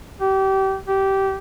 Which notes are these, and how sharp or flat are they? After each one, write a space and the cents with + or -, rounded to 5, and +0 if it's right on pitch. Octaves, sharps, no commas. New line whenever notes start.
G4 -30
G4 -20